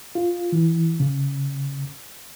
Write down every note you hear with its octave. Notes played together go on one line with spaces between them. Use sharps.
F4
E3
C#3